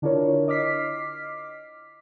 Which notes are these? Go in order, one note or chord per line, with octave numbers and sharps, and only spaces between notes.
D3 D4 E4 F4 A#4 C#5
D#5 D6 F6 B6 C7